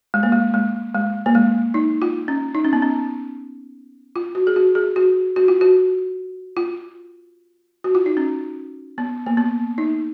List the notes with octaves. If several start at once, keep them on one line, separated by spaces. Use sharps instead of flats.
G#3
A#3
G#3
G#3
G#3
A#3
G#3
D#4
F4
C#4
D#4
C#4
B3
C#4
F4
F#4
G#4
F#4
G#4
F#4
F#4
F4
F#4
F4
F#4
F4
D#4
C#4
B3
A#3
B3
D#4